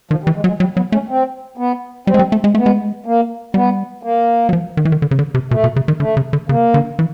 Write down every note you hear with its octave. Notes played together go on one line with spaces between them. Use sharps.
D#3 F3
G3
E3
G#3
F#3
G#3
F#3 G3
F#3 B3
A3 C#4
C4
B3
G3 C4
G#3
G3
A3
G#3
A3 B3
G#3
A#3
G3 B3
A#3
F#3
F3
D#3
E3
D#3
D3
C#3
D3
C3
B2 A3
B2
C#3
D#3
D3 A3
C#3
D3
C#3 A#3
D3
E3